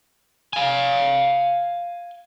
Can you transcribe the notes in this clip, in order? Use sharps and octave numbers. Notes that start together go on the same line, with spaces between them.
F5 G#5